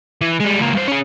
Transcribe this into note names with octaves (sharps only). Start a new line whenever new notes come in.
E3
G3 G#3
C#2 A#3
G2 C5
C#4 G#4